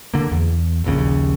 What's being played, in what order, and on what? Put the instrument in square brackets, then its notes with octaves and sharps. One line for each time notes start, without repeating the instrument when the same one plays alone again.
[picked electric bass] D3 A#3
E2
D#1 A#1 D#2 C#3